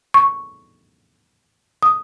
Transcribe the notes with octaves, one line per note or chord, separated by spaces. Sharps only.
C#6
D#6